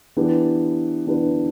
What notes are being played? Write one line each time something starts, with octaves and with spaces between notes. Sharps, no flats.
E3 B3 D4 G4 B4
E3 B3 D4 G4 B4